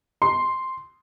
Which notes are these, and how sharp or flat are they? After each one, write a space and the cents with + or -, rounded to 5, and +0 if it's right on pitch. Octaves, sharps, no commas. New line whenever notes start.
C6 +0